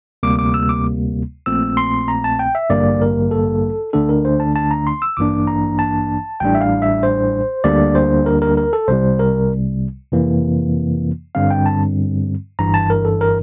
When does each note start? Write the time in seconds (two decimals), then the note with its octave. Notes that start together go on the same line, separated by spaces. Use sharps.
0.23 D2 C3 G3 A#3 D6
0.39 D6
0.54 E6
0.69 D6
1.46 A#1 A#2 A3 C4 E6
1.77 C6
2.08 A#5
2.24 A5
2.39 G5
2.55 E5
2.70 A1 G2 D3 G3 A#3 D5
3.02 A#4
3.31 A4
3.93 D2 D3 A3 D4 A4
4.09 A#4
4.25 C5
4.40 A5
4.56 A5
4.71 A#5
4.87 C6
5.02 E6
5.17 A1 G2 E3 A#3 D4 D6
5.48 A#5
5.79 A5
6.40 A1 A2 G3 D4 G5
6.55 E5
6.61 F5
6.82 E5
7.03 C5
7.64 D2 D3 G3 A#3 D4 D5
7.95 C5
8.26 A#4
8.42 A#4
8.57 A#4
8.73 A4
8.88 C2 C3 G3 C5
9.19 A#4
10.12 F2 C3 E3 A#3
11.35 G2 D3 G3 C4 F5
11.51 G5
11.66 A5
12.59 G1 G2 E3 A#5
12.74 A5
12.90 A#4
13.05 A4
13.21 A#4